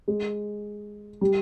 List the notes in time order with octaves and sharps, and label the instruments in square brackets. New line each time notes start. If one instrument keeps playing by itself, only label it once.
[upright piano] G#3
G3